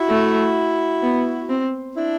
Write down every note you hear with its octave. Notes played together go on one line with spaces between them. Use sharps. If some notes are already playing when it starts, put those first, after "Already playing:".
Already playing: E4 F#4
A3
B3
C4
D4 E4